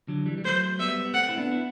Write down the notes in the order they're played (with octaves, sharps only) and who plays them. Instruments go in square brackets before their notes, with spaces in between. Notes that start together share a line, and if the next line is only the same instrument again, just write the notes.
[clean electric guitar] D3 F#3
E3 G3
G3
[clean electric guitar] F#3 A3 [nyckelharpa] C5
[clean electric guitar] G3 B3 [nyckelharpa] E5
[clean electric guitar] B3
[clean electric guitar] A3 C4 [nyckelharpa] F#5
[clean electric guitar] E4
B3 D4
E4